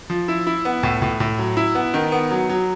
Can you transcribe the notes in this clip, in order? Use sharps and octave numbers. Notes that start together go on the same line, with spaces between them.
F3
E4
E4
B3
A2
A2
A2
F#3
E4
B3
D#3
B3
F#3
F#3